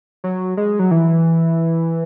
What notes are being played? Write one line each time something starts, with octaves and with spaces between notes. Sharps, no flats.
F#3
G#3
F#3
E3